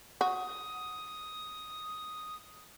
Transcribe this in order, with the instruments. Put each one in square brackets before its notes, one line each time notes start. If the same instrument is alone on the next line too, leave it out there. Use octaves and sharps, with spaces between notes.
[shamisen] F#4 [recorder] D#6